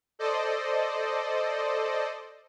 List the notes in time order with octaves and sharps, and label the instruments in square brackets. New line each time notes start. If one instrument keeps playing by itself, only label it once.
[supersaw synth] A4 C5 D5 D#5